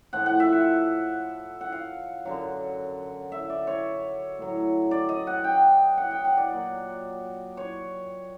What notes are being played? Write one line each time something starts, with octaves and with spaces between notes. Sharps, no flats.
A2 F3 F#5
F#5
E5
F#5
F#5
F5
F#2 D3 F#3
E5
D5
C#5
A2 F#3
D5
D#5
F#5
G5
F#5
G5
F#5
D5
A#2 F#3
C#5